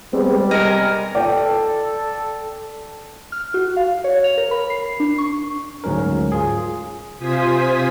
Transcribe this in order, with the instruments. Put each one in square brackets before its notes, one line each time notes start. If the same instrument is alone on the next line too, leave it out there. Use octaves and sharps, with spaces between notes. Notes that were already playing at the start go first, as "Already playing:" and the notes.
[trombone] G3 [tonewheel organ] G#3 B3 C4
[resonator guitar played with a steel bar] C3 D#5 [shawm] A#4 [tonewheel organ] G#5 A#6
[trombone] A4 [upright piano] D5 G5
[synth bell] F6
F#4
F5
C#5
F7
A#4
B5
C7
D4
C#6
[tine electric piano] D2 G#2 F#3 C#4 A#4
F4 G#4
[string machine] C3 F4 C5 G#5 D#6 B6